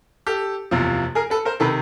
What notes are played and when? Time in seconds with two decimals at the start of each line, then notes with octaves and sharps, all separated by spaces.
0.27 G4 A4
0.71 F#1 E2 C3 F3
1.15 G#4 A#4
1.30 A4 B4
1.45 A#4 C5
1.60 C3 D#3 A4 B4